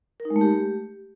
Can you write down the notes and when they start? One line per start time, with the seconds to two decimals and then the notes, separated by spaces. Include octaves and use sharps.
0.20 A#4
0.25 D#4
0.30 G#3
0.36 A3
0.41 G4